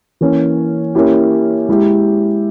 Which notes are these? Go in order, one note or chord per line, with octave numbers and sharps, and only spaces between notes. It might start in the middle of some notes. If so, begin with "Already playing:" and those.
E3 A#3 C#4
A#3 C#4 E4 G4
G#3 E4 G4